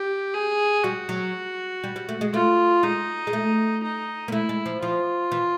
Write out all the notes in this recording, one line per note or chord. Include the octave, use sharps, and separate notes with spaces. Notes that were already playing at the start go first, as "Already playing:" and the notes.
Already playing: G4
G#4
G3 F#4
F#3
G3
G3
A3
G#3
A3 F4
G#3 D#4
G#3
A3
D#4
A#3
A3 E4
G#3
F3
F3 F4
E3